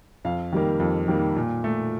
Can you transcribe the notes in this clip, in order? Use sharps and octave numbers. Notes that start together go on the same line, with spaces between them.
F2 F5
D#3 G3 A#3
F2
D#3 G3 A#3
A#2
A3